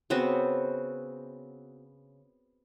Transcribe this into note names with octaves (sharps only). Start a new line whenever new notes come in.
C#3 B3 C4 F#4